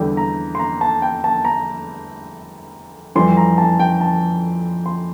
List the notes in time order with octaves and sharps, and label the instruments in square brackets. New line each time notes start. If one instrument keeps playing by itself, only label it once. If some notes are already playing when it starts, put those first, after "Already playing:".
Already playing: [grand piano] E2 D3 G3 G5
A#5
C6
A#5
A5
G5
A5
A#5
F2 E3 G3 C6
A#5
A5
G5
A5
C6